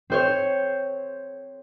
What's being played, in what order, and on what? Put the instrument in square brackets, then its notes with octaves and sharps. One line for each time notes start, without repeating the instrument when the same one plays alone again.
[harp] C4 C5 C#5